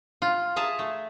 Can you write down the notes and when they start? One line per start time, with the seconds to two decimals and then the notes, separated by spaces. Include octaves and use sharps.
0.22 F4
0.56 G#4 E5 A5 A#5
0.79 A3